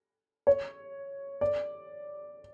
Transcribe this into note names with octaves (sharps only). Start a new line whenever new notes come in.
C#5
D5